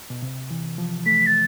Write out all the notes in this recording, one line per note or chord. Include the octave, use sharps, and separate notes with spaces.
B2
C3
E3
F3
A3 B6
A6